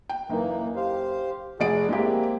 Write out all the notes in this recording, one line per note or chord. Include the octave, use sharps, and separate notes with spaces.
G5
F#1 E3 A#3 D#4
G4 C5 F5
F1 F#4 G#4 D5 D7
G#3 A#3 C4 E4 G4